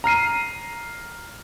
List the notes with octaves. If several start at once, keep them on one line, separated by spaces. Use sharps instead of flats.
A#5 F6 C7 D#7